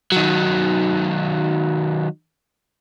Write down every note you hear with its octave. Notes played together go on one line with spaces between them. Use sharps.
D#3 F#3